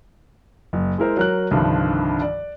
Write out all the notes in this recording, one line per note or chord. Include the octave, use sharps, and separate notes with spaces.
F#1
G#3 E4 A#4 C5
F#3 A#4 F#6
C2 G2 D3 D#3 F3
D5